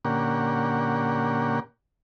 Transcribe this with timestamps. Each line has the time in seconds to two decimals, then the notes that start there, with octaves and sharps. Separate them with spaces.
0.05 A#2 D3 A#3 C#4 G4 F#5